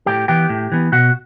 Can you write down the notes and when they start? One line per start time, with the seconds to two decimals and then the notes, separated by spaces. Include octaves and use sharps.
0.06 A2 G4 G5
0.28 E3 B3 G4 G5
0.49 A2
0.72 E3 B3
0.92 B2 F#4 F#5